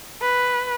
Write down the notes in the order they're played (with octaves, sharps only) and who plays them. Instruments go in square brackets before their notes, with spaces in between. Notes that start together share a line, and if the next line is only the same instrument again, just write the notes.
[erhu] B4